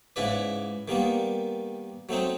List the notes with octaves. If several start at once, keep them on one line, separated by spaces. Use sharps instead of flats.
G#2 C#3 E4 B4 D5
D#3 G3 A#3 B3
F#3 A3 C4 D#4